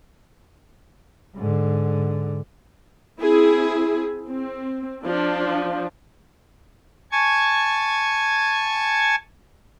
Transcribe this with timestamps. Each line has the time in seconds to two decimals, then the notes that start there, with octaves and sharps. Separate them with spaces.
1.35 G#2 D3
3.20 C4 E4 G#4
4.28 C4
5.03 F3 D4
7.12 G#5 A5 C#6 G#6